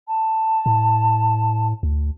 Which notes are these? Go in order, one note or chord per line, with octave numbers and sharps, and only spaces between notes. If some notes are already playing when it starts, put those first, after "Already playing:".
A5
A2
D2